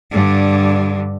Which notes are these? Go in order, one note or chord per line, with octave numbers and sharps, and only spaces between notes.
G2 D3